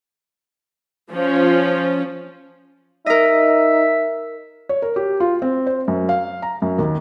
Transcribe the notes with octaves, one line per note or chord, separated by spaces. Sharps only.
F3 C#4
D#4 A#4 D#5 E5
C#5
A#4
G4
F4
C4
C5
F#2
F5
A#5
F#2
D#2